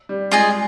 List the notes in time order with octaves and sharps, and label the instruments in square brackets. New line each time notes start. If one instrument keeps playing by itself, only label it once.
[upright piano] G3
[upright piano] G#3 [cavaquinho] F4 G#4 D#5 G#5